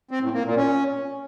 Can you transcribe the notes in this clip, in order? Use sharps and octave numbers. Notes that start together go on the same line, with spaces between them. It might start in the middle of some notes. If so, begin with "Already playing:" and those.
C4
A2
A#3
A#2
C#4